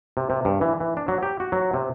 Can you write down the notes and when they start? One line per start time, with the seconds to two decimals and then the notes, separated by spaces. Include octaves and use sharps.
0.17 C3
0.30 C3
0.45 G2
0.61 E3
0.80 E3
0.97 D4
1.08 F#3
1.23 G4
1.40 F#4
1.52 F#3
1.74 C3